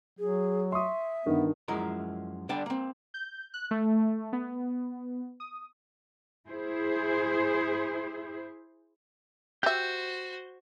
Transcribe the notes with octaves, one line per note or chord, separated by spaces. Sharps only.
F#3 G#4
E5 C6 C#6 D#6
G2 D3 D#3 B3
F#2 F3 G#3 E4 A#4 A#5
D3 G3 D4 G5 A5
A#3 C4
G6
F#6
A3
B3
D#6
E4 G#4 C5
F#4 G4 C5 E5 G6